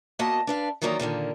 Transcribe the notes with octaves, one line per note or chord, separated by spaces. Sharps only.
A#3 B3 F#4 D#5 A5
D4 B4 F5
D#3 E3 F#3 A#3 D#4 D5
A#2 D3 D#3 A#3